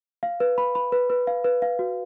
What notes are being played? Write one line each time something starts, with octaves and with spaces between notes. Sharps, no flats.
F5
B4
B5
B5
B4
B4
F5
B4
F5
F#4